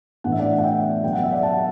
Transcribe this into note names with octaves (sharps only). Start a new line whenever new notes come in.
A2 E3 A3 D4 F#5
E5
D5 F#5
F#5
E5 G5
B2 F#3 B3 G5
F#5
E5
D5 F#5
F#5 A5